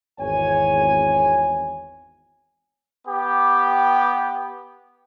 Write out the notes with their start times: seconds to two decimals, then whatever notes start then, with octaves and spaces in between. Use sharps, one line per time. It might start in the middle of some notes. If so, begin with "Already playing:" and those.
0.19 G#1 E2 C#5 G#5
3.08 B3 G4